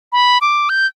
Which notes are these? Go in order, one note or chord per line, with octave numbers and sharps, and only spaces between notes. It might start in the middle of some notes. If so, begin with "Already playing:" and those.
B5
D6
G6